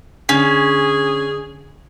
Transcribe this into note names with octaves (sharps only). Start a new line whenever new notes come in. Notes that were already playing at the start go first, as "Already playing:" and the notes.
D3 C#4 G#4